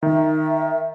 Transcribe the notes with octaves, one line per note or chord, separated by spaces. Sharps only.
D#3 E5